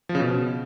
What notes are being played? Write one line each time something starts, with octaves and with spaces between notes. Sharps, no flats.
F3
C#3
B2